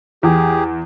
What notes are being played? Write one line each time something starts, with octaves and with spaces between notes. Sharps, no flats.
E2 G4 G#4